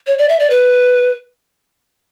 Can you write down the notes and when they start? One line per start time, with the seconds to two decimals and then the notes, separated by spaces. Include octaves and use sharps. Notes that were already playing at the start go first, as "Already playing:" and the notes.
0.07 C#5
0.18 D5
0.29 E5
0.40 D5
0.50 B4